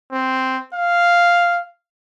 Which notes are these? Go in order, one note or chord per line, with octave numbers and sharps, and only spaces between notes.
C4
F5